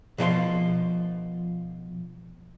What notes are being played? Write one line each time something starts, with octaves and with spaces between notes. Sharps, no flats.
B2 F3 C#5 C6